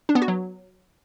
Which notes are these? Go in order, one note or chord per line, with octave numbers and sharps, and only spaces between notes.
D4
B3
F#4
F#3